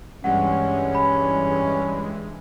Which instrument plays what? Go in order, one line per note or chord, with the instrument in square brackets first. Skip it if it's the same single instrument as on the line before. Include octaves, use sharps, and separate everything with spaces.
[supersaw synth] G2 E3 G#3 [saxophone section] G3 C#4 [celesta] F#5
[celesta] B5